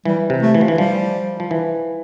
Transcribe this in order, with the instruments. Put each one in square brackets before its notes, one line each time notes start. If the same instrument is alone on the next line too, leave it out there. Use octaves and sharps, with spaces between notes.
[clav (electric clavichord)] E3 [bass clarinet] G3
[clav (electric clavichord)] C3
[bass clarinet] A3
[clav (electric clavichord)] E3
F3
E3
[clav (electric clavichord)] F3 [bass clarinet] G3
[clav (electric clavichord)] F3
E3